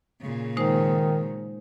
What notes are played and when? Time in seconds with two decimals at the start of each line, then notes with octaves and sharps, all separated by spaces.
0.22 A#2 C#3
0.57 D#3 G#3 D#4 C5